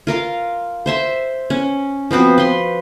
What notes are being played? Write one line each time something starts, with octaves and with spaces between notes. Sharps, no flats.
F4 A#4 F5
C5 E5 C6
C#4
F3 B3 C4 F#4
B4 C6